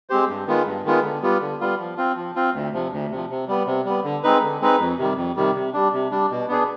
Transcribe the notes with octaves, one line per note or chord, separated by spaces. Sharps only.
G#3 C4 G4 C5
G2
D#3 G#3 B3 F4
G2
D#3 G#3 B3 F4
D3
G3 B3 F4
D3
G3 B3 F4
F3
C4 F4
F3
C4 F4
D2
C3 F3
D2
C3 F3
C3
G3 B3
C3
G3 B3
D3
G#3 C4 D#4 B4
D3
G#3 C4 D#4 B4
F2
C3 D#3 G3
F2
C3 D#3 G3
C3
G3 D4
C3
G3 D4
B2
B3 D4 G#4